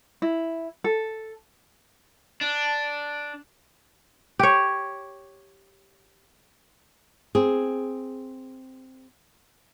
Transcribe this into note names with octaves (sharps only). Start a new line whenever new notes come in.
E4
A4
D4
G4 C#5
C4 G#4